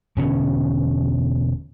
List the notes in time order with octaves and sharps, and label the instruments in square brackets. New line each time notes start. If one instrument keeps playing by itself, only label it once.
[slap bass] E1 B2 D3 C#4